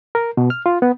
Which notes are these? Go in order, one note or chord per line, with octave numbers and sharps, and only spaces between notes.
A#4
B2
F6
F4
B3